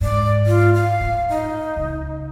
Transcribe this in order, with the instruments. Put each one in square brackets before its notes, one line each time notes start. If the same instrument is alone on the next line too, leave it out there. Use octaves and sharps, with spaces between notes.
[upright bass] G#2 [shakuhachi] D5
[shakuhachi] F4
F5
[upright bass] A2
[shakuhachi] D#4
[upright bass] C#2